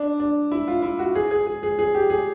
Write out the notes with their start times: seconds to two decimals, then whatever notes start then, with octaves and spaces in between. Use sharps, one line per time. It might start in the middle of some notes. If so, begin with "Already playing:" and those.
Already playing: D4
0.20 D4
0.52 E4
0.68 F4
0.82 E4
0.99 F#4
1.15 G#4
1.31 G#4
1.47 G#4
1.63 G#4
1.79 G#4
1.95 G4
2.10 G#4